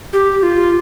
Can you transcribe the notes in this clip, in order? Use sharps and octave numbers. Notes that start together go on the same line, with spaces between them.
G4
F4